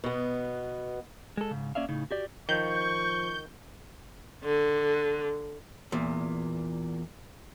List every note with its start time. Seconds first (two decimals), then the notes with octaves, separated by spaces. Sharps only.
0.04 B2 B3
1.37 G#3 A4
1.51 G#2 C#3
1.75 A#3 C#4 D5 E5 F5
1.89 A2 C#3 D#4
2.11 F#4 G4 D5
2.49 D#3 F3 C#6 G6
4.44 D3
5.92 E2 A#2